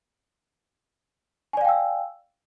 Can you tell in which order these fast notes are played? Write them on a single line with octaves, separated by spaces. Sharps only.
G#5 D5 F5 G5 E6